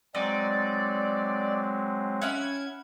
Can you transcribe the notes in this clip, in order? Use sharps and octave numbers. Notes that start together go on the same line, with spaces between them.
F#3 G#3 C4 D#4 D5
C#4 E4 F#5 G#6